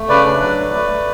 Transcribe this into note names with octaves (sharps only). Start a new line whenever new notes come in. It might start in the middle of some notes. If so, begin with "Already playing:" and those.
Already playing: A3
C#3 B4 D5
D4
F#3
A3
A3
A3